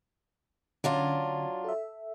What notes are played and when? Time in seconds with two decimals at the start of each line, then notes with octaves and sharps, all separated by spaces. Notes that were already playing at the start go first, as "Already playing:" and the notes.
0.84 D3 F#3 C#4 D4 F4
1.64 A4 E5